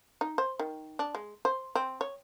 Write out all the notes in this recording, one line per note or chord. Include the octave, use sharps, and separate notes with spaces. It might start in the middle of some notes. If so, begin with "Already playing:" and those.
D#4
C5
D#3
D4
G#3
C5
C4
C#5